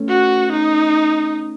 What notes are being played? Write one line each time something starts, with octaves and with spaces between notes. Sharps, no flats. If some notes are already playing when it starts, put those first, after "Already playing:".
Already playing: A3 C#4
F#4
D#4